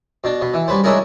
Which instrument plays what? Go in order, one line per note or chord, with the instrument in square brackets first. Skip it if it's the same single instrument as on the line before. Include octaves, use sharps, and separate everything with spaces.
[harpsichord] B2 D4
B2
E3
G3 C#4 B4 C5
G#3 C#4 D4 E4 G#4 A#4